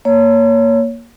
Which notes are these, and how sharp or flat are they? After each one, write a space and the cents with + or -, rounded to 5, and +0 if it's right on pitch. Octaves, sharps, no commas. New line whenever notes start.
A#3 +0 C#5 +15